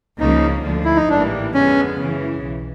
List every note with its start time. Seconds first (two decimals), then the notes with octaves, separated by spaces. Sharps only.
0.19 C#2 C#3 F3 A#3 D#4
0.64 D2 D3 F3
0.84 E4
0.96 D#4
1.09 A1 G#2 E3 G3 A#3 D4
1.54 F2 D3 F3 G#3 B3 C#4
2.00 F#2 C#3 E3
2.44 B1